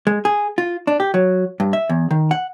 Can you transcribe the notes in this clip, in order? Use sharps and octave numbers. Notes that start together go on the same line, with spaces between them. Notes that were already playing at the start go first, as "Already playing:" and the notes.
G#3
G#4
F4
D4
G4
F#3
G2
E5
E2
D#3
F#5